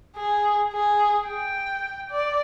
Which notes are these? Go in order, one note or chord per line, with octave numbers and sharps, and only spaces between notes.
G#4
G#4
G5
D5